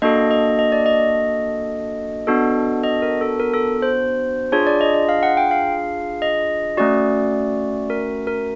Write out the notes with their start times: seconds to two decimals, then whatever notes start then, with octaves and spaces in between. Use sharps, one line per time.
0.02 A#3 D4 F#4 A4 D#5
0.31 D#5
0.59 D#5
0.72 D5
0.86 D#5
2.27 B3 D4 F#4 A4
2.84 D#5
3.02 A#4
3.21 A4
3.40 A#4
3.54 A4
3.82 C5
4.52 D4 F4 G#4 C#5
4.67 D5
4.81 D#5
4.94 D#5
5.09 F5
5.23 F#5
5.37 G5
5.51 F5
6.22 D#5
6.77 A3 C#4 F#4 D5
7.90 A#4
8.27 A#4